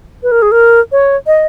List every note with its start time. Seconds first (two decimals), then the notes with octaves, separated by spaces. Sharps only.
0.23 B4
0.32 A#4
0.42 G#4
0.52 A#4
0.92 C#5
1.27 D#5